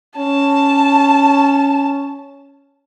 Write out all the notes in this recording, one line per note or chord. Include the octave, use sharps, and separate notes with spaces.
C#4 A5